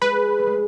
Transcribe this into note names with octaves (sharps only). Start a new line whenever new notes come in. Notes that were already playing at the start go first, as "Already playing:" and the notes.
G#3 B4
A3
G#3